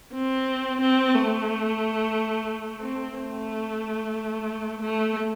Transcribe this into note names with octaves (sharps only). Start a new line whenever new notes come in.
C4
C4
A3
C4
A3
A3